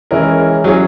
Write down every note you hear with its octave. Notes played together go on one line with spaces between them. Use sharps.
E3 G#3 C#4 E4 A#4
F#3 C#4 E4 G#4 C#5